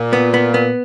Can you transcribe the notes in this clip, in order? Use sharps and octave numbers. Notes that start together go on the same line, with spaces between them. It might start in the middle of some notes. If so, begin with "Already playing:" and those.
Already playing: A#2
B3
B3
B3